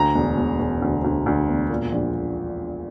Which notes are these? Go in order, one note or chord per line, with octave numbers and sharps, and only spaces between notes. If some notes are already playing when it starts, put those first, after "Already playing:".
Already playing: D2 A#5
E1
E1
E1
D2
D2
D2
E1
A#2
A#1